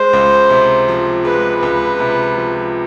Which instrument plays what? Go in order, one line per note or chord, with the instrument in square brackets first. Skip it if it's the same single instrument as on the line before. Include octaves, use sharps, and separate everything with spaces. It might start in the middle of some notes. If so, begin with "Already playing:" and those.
Already playing: [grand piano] G#3 [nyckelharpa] C5
[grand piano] C#2
C3
F3
[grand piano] G#3 [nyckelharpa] B4
[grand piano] C#2 [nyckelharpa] B4
[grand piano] C3
F3